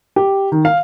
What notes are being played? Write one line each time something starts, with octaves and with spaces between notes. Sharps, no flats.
G4
D#3
F5